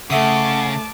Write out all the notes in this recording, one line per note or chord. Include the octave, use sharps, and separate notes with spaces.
C#3 A3 E5 F#5 A5 D6 D#6